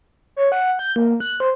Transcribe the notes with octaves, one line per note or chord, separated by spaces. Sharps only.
C#5
F#5
G6
A#3
F#6
C5